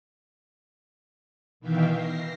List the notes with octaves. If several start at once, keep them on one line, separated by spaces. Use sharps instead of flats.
B2 D#3 E3 E5 F5 G5
A#6 C7